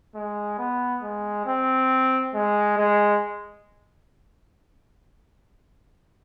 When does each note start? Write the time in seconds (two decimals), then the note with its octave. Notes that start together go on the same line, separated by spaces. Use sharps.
0.14 G#3
0.58 B3
1.03 G#3
1.46 C4
2.34 G#3
2.77 G#3